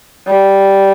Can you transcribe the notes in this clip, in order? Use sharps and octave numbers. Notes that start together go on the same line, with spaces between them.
G3